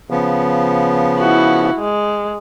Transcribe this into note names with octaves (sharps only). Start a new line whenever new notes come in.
C#3 F3 B3
E4 F#4
G#3